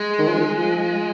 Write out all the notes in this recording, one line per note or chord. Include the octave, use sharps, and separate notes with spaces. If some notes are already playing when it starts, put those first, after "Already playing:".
Already playing: G#3
D#3
F3
D#3
F3